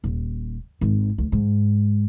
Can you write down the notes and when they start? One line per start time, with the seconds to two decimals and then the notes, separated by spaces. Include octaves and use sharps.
0.04 D#1
0.81 G#1 D#3
1.18 D2
1.32 G#2